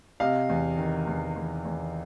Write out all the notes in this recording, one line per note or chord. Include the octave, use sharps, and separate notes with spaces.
C3 D#5 F5
E2
D#3
E2
E2
E2